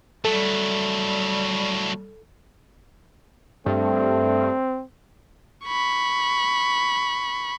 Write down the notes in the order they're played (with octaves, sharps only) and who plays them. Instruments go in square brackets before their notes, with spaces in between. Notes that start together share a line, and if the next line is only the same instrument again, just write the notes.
[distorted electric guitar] F#3 A3 [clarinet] G3 [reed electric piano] A4
[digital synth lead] G2 [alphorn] A3 [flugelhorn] C4
[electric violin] B5 C#6